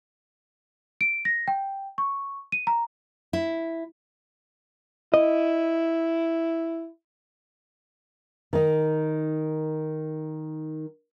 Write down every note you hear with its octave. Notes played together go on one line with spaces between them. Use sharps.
D7
A#6
G5
C#6
D#7
A#5
E4
E4 D#5
D#3 D#4